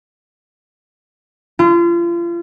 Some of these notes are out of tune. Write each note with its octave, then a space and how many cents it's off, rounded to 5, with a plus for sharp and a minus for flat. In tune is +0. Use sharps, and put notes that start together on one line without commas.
F4 -35